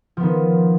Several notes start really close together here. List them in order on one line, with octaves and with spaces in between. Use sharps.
F3 B3 D#3